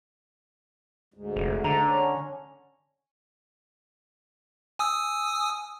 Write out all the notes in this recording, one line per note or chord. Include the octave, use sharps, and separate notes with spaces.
D2 G#2
F1
D3 A#5
C#4
G#5 D#6 E6